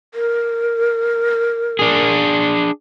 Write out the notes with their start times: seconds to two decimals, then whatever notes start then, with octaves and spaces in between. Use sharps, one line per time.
0.14 A#4
1.79 D4 G#4